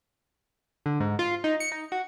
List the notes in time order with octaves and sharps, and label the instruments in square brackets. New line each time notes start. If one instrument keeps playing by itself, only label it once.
[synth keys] D3
G#2
F4
D#4
C#7
D#4
F#4